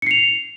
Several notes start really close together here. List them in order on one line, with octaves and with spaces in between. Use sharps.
C#7 C7 F7